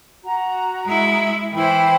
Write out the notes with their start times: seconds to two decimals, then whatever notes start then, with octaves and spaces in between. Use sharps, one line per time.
0.25 F#4 A#5
0.86 G#3 E4
1.54 E3 E4 C5 G5 B5